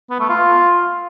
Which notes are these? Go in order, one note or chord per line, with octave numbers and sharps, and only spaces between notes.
B3
A3
F4